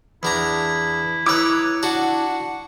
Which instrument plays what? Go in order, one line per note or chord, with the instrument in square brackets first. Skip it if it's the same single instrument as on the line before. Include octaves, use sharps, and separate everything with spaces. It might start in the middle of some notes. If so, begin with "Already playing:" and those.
[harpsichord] E2 D4 A#5 [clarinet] E4
[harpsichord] D#4 B4 [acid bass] E4 [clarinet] C#5 [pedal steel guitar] D6 E6 F#6
[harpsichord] D4 F#4 A5 [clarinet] F#5